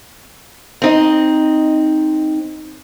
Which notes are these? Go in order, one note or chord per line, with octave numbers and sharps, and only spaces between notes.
C4 D#4 D#5